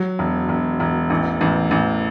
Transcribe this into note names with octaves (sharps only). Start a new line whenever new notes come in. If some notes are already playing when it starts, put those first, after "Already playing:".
Already playing: F#3
E1
E1
E1
A1
A1
A1